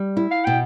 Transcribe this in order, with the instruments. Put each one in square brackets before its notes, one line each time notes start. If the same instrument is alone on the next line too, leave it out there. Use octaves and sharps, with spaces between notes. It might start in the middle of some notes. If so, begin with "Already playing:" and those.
Already playing: [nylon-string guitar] G3
E4
[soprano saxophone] F5
[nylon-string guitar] B2 [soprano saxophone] G5